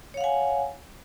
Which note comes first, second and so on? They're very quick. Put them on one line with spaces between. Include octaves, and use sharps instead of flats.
C#5 F5 F#5 G#5